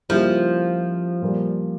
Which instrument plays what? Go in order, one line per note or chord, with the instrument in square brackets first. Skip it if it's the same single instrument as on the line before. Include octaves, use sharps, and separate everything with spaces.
[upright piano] C#3 G3 A#3 E4 G4 [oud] F3
[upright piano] A#2 G3 A#3